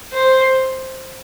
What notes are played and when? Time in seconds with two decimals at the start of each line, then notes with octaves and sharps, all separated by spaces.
0.13 C5